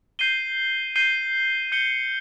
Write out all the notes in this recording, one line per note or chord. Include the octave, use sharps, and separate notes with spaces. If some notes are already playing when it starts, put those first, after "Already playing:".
G6 C7 D#7 G7
G6 C7 D#7 G7
G6 C#7 G7